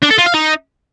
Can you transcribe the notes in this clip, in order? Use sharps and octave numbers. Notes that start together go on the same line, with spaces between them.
D4
A4
F4
F5
D#4